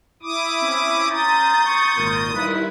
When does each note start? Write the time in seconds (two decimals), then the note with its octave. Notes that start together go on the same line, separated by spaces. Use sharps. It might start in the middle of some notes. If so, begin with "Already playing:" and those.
0.23 E4 D6 D#6
0.60 C4 C#4
1.11 A#5 C6 D#6 G6 A6
1.66 C#6
1.97 G#1 A#2 A#4
2.35 D#3 G3 E4 F4 B4